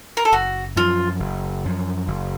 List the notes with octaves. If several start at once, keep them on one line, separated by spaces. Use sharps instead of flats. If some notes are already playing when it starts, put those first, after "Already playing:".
A#4
A4
F#1 F#4
F#2 F3 F4
F#1
F#2 F3
F#1